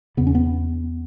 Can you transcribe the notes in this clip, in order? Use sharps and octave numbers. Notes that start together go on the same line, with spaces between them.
E2 C#3 B3
C#4
B3